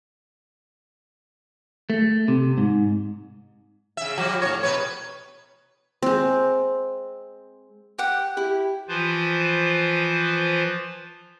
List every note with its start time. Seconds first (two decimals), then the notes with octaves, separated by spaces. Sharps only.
1.90 A3
2.28 C3
2.58 G#2
3.97 C#3 E5
4.17 F3 G3 F#4
4.42 A2 C3 C#5
4.63 B2 B4 C#5
6.02 G#3 C4
7.98 G4 F#5
8.37 E4 G4
8.88 E3 F3 F4 B4 C5